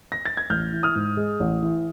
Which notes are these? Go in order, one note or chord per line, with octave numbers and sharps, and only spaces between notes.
A#6
A6
G#6
A1 F6 G6
E3
D#6 F6
G#2
G#3
A1
E3